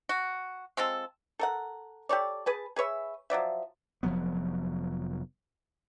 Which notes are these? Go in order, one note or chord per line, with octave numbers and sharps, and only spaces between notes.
F#4
G#3 C4 F4 A4
A4 A#4 F#5
G4 A4 C#5 D5
G#4 B4 A5
G#4 B4 C#5 E5
F3 F#3 D5 E5
F1 F3 F#3 B3